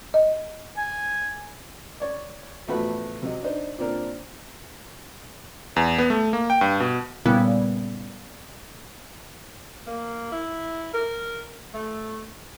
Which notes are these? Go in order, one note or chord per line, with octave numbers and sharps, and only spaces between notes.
D#5
G#5
C#5 D5
A1 F3 A3 B3 F#4 B5
C3 F#3 D#5
D4 D#4 C5
A#2 C4 D4 A#4
E2
B3
A3
A#3
G5
G2
B2
A#2 C#3 G3 B3 E4
A#3
E4
A#4
A3